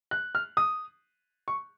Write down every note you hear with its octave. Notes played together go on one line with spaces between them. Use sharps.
F#6
F6
D#6
C#6